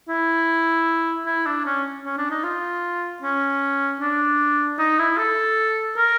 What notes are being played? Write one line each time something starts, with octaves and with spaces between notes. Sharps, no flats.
E4
E4
D4
C#4
C#4
D4
D#4
F4
C#4
D4
D#4
E4
A4
A#4